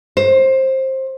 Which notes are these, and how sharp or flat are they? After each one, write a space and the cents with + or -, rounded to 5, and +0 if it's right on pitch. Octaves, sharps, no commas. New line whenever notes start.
C5 +20